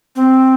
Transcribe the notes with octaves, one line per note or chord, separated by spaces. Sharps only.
C4